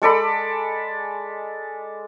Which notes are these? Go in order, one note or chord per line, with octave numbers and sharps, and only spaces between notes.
G#3 A4 D5 B5